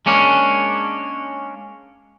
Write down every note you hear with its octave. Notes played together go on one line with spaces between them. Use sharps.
G#3 A#3 C#4 D4